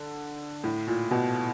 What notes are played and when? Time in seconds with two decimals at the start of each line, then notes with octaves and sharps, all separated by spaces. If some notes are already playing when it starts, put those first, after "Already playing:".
Already playing: D3
0.64 A2
0.87 A#2
1.11 B2